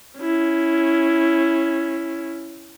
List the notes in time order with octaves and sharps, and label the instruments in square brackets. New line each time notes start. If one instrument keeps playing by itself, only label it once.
[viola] C#4 E4